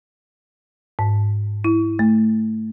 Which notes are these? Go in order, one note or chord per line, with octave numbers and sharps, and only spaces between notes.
G#2
E4
A3